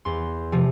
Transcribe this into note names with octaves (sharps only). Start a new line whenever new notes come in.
E2 C6
C3 F3